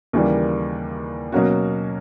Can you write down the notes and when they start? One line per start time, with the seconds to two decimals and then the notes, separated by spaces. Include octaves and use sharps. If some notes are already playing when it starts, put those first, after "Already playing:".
0.13 D#2 C#3 E3 G3 A#3
1.32 B2 F#3 A#3 C#4 F#4